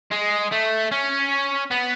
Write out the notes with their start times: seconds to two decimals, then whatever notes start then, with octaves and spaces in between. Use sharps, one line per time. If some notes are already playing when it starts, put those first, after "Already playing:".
0.11 G#3
0.52 A3
0.92 C#4
1.71 B3